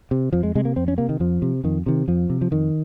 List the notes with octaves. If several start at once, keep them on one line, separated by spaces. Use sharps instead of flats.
C3
F2 F3
G#3
C3 G#3
A#3
F2 C4
C#4
C3 A#3
D#3
F2 F3
C3
F2 D#3
C3 D#3
F2 F3
C3
F3
F2 D#3